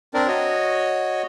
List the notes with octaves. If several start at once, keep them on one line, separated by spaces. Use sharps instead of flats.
C4 D4 A#4 D5
F#4 C#5 D#5